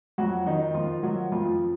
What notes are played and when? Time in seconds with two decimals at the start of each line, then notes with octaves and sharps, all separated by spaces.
0.18 F2 F#3 F#4
0.46 D#3 D#4
0.74 D#3 F3 F4
1.03 F3 F#3 F#4
1.32 F2 F3 F4
1.45 F3 F4